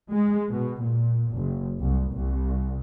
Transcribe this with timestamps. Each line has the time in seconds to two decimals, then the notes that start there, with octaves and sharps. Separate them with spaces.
0.13 G#3
0.50 B2
0.83 A#2
1.31 F#1
1.79 C2
2.15 C2